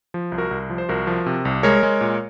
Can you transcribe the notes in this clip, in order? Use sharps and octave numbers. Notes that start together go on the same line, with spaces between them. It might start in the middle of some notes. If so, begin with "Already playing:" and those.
F3
C2
F#4 A#4
C2
F3
C5
C2 F#4 A#4
F3
C3
C2
G#3 A#4 C#5
G#3
A#2